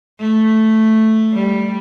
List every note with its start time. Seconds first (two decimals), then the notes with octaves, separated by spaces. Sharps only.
0.20 A3
1.33 G3